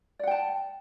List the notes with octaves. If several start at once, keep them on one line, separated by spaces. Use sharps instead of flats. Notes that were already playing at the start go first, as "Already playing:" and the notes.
D5 F#5 G5 A5